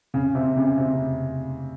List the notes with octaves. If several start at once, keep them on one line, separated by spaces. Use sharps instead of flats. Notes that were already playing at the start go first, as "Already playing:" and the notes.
C#3
C3
C#3
C3